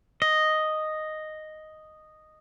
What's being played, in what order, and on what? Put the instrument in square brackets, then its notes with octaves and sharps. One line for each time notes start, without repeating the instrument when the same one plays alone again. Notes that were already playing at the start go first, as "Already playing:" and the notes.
[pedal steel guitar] D#5